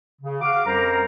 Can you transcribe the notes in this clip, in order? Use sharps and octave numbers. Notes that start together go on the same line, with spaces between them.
C#3
F#4 F5 D6
F2 G3 C#4 A#4 C5 A#5